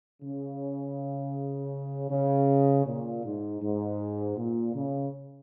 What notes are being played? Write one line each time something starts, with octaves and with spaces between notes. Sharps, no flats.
C#3
C#3
A#2
G#2
G#2
A#2
C#3